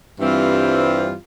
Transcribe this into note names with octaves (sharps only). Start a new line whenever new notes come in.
G2 E3 G3 C4 F4